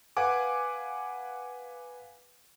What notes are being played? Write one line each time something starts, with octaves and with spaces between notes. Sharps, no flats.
B4 F5 F#5 G#5 D6